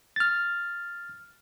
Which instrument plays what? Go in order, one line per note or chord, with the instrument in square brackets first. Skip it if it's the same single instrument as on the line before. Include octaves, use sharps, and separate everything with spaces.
[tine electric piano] F6 A6